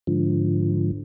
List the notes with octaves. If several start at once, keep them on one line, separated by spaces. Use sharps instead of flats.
G#2 D3 F3